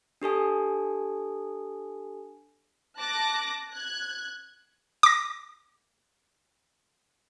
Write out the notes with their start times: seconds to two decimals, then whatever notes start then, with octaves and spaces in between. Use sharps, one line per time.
0.22 D4 G4 A4 G#5
2.98 A5 D6 F#6 A#6
3.71 F#6 G#6
5.03 D6 A#6